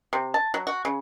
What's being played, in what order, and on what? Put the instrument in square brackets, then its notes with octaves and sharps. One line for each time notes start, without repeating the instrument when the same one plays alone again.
[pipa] C3
A5
F#3
F#4
C#3